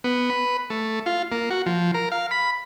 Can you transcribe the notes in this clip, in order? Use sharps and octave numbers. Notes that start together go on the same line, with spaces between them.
B3
B4
A3
F4
A#3
F#4
F3
A#4
F5
B5